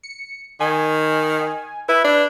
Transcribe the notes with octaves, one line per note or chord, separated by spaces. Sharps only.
C#7
D#3 G#5
E4 B4
D4